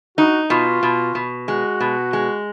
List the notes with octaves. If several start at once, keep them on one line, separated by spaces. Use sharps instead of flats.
D#4 F#4
B2 F4
B2
B2
G#3 F#4
B2
G#3